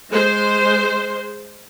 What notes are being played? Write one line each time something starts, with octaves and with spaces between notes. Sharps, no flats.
G#3 C5